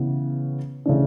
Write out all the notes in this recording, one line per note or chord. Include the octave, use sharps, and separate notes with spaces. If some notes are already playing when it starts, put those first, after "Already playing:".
Already playing: C#3 E3 B3
C#3 E3 A3 D4